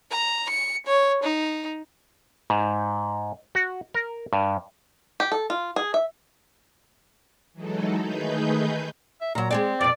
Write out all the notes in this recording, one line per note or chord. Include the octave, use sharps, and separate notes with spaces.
A#5
C#7
C#5
D#4
G#2
F#4
A#4
G2
G4
A4
F4
G#4
E5
E3 F#3 G#3 D#4 A4
D#3 A3 D#4 G#4 B4 G6
E5
A#2 F#3 A#5
G#3 C4 G#4 D5
F2 B2 D5